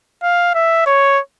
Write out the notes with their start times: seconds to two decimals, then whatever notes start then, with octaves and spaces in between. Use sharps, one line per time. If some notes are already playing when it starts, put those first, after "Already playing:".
0.23 F5
0.55 E5
0.86 C#5